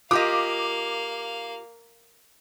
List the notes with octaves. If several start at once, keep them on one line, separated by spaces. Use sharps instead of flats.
A#3 F4 G4 D#5 F5 D6